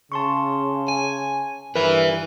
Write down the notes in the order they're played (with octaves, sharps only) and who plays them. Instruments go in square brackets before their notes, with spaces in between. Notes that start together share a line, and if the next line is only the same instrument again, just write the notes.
[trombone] C#3 [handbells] A5 C6 C#6
[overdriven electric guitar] G#5
[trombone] G2 [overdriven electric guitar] E4 B4 [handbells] A#4